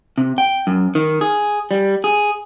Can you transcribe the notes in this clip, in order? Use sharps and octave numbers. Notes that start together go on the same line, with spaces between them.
C3
G5
F#2
D#3
G#4
G3
G#4